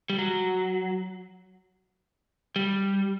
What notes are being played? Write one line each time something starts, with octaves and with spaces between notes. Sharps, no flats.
G3
F#3
G3